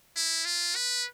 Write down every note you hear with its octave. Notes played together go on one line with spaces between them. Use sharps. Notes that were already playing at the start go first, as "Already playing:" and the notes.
E4
F4
B4